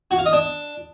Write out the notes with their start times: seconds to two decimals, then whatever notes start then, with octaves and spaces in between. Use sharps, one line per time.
0.11 F#4
0.18 F5
0.26 D#5
0.33 D4